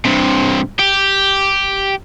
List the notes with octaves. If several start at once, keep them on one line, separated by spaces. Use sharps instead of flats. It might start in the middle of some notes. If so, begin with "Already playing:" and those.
G2 C3
G4